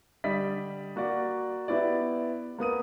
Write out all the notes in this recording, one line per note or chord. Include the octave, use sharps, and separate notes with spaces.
D3 G3 D5 D#5 B6
A#3 F#4 A#4 D5
B3 E4 G4 D5
A#3 B3 D#6 D#7